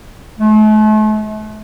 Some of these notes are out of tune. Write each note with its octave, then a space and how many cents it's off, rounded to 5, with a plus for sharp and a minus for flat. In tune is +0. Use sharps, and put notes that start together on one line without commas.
A3 -40